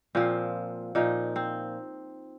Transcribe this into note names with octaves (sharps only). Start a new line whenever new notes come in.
A#2 F3 C4
A#2 F3 D#4
C4